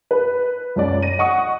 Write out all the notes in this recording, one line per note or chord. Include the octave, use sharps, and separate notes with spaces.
B4 B5
C#2 F#2 D5
A#6 D#7
D#5 F#5 C#6 D#6